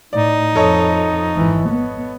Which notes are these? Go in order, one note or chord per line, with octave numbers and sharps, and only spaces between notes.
A2 D#4 D5
F2 A4 C#5 D#5
G#1 E3
B3